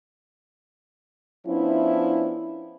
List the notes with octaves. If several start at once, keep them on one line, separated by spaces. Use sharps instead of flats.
F3 B3 C#4 D4 E4